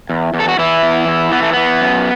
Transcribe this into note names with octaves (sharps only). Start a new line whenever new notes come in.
E2
E2
A4
F#4
E2 E3 E4
E2
E2
E3 B3
A3
E3 B3
F#2